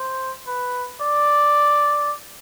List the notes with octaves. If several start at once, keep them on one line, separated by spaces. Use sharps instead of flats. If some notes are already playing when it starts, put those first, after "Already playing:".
Already playing: C5
B4
D5